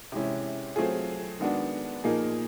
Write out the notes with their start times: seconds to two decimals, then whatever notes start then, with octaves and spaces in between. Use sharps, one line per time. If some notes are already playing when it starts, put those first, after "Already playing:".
0.12 C3 E3 G#3 C#4 E4
0.76 F#3 A3 C4 F4 G#4
1.40 D#3 G#3 B3 D4 F#4
2.04 A#2 F3 A#3 D#4 G#4